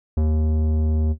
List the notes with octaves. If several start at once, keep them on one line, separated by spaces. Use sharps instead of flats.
D#2